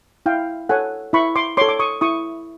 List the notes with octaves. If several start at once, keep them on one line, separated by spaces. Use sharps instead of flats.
E4 F5 G5
A4 C#5 F#5 G#5
E4 B5 C#6
C6 D6
A4 C#5 C6 D6
D6
C#6 D#6
E4 C#6 D#6